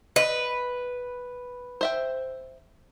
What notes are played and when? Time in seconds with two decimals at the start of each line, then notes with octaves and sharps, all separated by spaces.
0.16 B4 D#5
1.81 C5 E5 G5